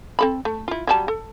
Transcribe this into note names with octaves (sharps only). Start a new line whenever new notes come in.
C4 A4 B5
A3
E4 F4
F#3 G3 A5
A4